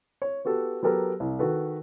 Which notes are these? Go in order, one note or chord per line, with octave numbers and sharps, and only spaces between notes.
C#5
B3 F#4 G4 A4
F#3 B3 G4 A4 A#4
C2
D#3 F#4 A4 B4